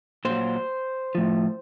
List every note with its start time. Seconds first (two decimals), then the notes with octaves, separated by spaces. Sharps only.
0.25 A#2 F#3 C5
1.15 A2 F3